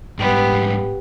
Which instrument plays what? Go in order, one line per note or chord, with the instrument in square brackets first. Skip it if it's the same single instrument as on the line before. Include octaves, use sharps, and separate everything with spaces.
[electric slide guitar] G#2 G3 [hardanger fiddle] B3 G4